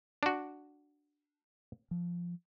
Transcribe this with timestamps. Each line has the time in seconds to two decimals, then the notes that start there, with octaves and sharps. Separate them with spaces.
0.23 D4 F#4
1.91 F3